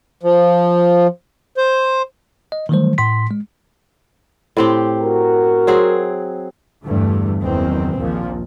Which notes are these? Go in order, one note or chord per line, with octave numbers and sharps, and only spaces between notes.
F3
C5
D#5
D#3 E3 F#3 G3 A3 C5
A2 C6 B6
G#3
A2 C4 G4
F#4 A#4
F#3 C4 G#4
E2 G2 D3 A3
F#1 E2 D#3 E3 C4
A#1 D#2 A#2 F3